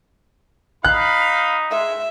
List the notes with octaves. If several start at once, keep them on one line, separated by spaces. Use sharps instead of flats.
D#4 F5 B5 F#6
G#3 E5